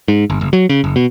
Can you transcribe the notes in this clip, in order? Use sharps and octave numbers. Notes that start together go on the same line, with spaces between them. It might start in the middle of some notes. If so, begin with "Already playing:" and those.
G#2
G1
F#1
F#3
C#3
F#1
B2